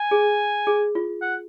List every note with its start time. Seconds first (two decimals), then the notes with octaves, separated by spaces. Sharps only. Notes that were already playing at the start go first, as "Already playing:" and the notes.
Already playing: G#5
0.11 G#4
0.67 G#4
0.95 F4
1.22 F#5